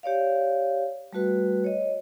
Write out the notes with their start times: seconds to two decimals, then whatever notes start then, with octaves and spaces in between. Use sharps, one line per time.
0.03 G4 C#5 D5 F5
1.13 G3 A3 F#4 B4
1.64 C#5 D#5